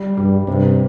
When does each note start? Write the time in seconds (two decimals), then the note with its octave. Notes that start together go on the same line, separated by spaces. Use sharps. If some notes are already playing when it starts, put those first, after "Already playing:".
Already playing: G3
0.17 G2 G3
0.47 G2 C3